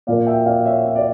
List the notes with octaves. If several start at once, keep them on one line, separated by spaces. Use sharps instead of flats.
A#2 F3 A#3 D5 F5
E5 G5
D5 F5
C#5 E5
E5
D5